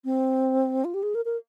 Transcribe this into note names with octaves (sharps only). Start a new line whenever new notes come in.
C4
F4
G4
G#4
A#4
A#4